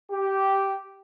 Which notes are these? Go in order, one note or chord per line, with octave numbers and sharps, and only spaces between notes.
G4